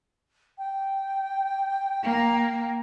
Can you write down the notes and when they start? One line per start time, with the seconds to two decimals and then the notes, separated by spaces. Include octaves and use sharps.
0.58 G5
2.03 A#3